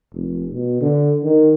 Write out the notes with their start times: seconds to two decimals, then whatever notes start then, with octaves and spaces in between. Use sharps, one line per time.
0.14 F1
0.52 B2
0.81 D3
1.24 D#3